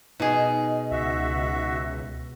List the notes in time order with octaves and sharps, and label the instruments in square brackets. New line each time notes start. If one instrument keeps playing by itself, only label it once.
[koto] B2 G#4 [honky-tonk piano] D#4
[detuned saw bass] C#2 [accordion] F#4 E5